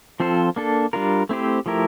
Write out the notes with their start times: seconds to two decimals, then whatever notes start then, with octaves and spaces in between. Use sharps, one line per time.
0.20 F3 C4 F4 A4 C5
0.56 A#3 D4 A4
0.93 G3 D4 F4 A#4
1.29 A3 C4 E4 G4 C5
1.66 F3 A3 E4 G4 A#4